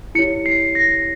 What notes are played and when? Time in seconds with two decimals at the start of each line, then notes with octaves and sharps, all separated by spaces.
0.15 E4 G4 C#5 C#7
0.46 C7
0.75 A#6